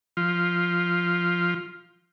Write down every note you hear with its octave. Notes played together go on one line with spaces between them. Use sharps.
F3 F4